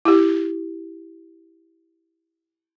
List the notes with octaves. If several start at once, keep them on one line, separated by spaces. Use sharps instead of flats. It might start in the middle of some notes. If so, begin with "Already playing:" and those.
E4 G4